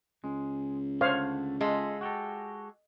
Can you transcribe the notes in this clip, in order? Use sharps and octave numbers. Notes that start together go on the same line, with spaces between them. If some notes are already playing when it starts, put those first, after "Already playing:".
C#2 G#3
D3 A3 C5 C#5 F5
G#3 F4 A4 E5
F#4 G4 A4